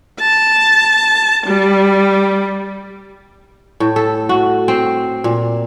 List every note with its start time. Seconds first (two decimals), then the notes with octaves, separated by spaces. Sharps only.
0.21 A5
1.47 G3
3.80 A2
3.96 A4
4.29 F#4
4.68 C4
5.24 A#2